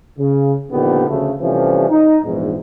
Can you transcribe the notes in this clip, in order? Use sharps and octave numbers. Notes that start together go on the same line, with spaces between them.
C#3
A#2 D3 D#3 F3 B3 G4
D2 C#3 A3
C3 E3 F3 G3 A3 C#4
D#4
A#1 E2 G#2